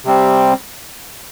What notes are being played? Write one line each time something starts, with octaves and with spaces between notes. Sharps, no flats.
C3 G3 C4